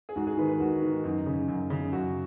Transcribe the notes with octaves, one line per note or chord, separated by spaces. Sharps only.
G#4
G#2 F#4
G#4
D#3 B4
B4
G#2 F#4
D#3
F#2 D#4
C#3
F#2
C#3
F#2 F#4